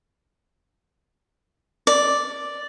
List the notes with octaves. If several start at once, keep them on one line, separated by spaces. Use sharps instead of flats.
D5